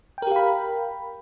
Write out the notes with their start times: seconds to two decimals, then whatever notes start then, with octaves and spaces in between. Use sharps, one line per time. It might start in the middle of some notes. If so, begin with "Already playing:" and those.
0.18 G5
0.22 A#4
0.27 G4
0.31 F5
0.36 B5